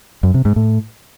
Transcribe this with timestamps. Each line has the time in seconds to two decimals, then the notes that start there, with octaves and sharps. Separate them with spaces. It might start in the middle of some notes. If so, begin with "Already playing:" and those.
0.23 F#2
0.34 C3
0.45 G#2
0.56 A2